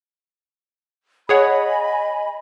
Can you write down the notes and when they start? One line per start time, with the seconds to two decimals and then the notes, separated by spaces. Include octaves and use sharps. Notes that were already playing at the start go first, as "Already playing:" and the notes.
1.29 G#4 C#5 D#5 F#5 G#5 B5